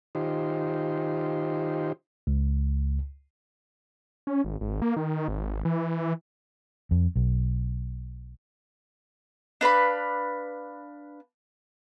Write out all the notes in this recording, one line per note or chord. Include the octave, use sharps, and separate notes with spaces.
D#3 D#4 F4 G4 C5
C#2
C#4
G#1
G#1
A#3
D#3
G#1
E3
F2
B1
D4 B4 F5 B5